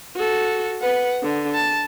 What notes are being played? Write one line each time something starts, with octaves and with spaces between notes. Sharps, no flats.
F#4 A4
B4 F#5
D3
A5